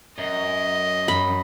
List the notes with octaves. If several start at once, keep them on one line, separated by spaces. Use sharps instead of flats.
F#2 D#5
F#2 B5